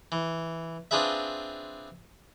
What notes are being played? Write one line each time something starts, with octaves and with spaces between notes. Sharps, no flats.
E3
C4 D4 F4 G#4 B4 E5